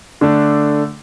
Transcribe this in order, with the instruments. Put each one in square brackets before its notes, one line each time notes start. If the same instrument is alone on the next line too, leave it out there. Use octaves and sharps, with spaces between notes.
[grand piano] D3 A3 D4